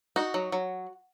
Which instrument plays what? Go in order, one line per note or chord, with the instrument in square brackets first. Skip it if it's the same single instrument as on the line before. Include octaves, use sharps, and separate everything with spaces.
[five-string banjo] D#4 F#4
F#3
F#3